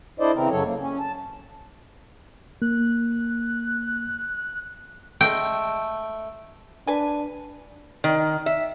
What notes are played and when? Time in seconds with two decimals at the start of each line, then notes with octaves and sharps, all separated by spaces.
0.20 D4 E4 A4 C5 D5 D#5
0.35 C#3 E3 C4 A#4
0.50 F#2 C#3 F#3 A4 C#5
0.64 A#3
0.80 C#4
0.99 A5
2.62 A#3 F#6
5.21 G#3 A3 G5
6.87 D4 B4 G#5
8.04 D#3
8.46 E5